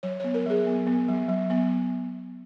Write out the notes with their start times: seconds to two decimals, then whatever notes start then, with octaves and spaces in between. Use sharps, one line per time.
0.03 F#3 C#5
0.20 B3 C#5
0.34 A#4
0.46 F#3 G#4
0.66 B3
0.87 B3
1.08 F#3
1.29 F#3
1.50 B3